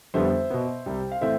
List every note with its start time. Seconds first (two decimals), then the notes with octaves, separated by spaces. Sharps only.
0.14 F2 D3 G3 B3 C5 E5
0.50 B2 B3
0.86 C2 C3 G3
1.11 F5
1.21 A2 E3 A3 C4 C5 E5